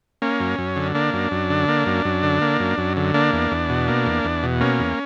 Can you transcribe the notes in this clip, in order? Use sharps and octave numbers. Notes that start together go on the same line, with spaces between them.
A#3 C#4
F#2
F#2
D3
A#3 D4
F#2
F#2
D3
A#3
F#2
F#2
D3
A#3
F#2
F#2
D3
A#3 D4
E2
E2
B2
A#3
E2
E2
B2
A#3 C#4
E2